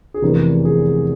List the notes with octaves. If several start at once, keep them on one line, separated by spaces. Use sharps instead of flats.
G#4
F1 E2 E3 A#4
G#4